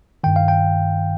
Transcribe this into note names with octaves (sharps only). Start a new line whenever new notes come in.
G2 D#3 G5
F5
G5